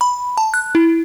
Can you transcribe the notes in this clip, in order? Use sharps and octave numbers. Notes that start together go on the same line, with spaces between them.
B5
A5
F#6
E4